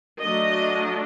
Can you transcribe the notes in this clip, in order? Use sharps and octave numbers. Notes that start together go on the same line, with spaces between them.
F#3 A3 D4 D#5